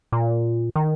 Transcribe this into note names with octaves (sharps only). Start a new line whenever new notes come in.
A#2
D#3